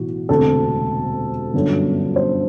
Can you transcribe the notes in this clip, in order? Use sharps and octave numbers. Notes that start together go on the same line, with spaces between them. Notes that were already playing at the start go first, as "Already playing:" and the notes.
Already playing: B1 A2 E3 F#4
E1 D2 C3 A4
G1 F#2 D3
C5